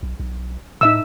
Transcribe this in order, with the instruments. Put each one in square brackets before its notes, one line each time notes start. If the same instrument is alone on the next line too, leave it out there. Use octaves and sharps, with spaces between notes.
[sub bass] B1
B1
[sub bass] A2 [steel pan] D#4 E5 E6